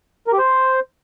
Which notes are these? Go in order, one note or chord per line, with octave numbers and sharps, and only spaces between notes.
A#4
G4
C5